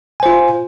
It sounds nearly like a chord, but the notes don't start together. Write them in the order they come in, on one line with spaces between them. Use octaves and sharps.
G#5 C5 F4